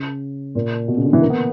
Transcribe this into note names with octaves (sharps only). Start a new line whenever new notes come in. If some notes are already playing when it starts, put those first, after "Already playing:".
Already playing: C#3
A#2
B2
C#3
D3
E3
A#3
B3